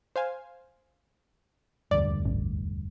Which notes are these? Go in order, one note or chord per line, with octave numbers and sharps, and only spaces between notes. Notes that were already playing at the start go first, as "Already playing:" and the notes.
C5 F5 G#5
E1 D2 G2 D5
A1